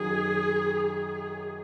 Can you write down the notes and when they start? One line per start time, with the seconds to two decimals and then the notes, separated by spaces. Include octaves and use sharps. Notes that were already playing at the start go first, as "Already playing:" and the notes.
Already playing: F#2 D#3 F#3 G#4
0.84 G#4